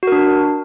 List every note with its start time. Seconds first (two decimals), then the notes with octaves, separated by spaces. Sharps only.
0.03 F#4
0.07 A#4
0.12 D4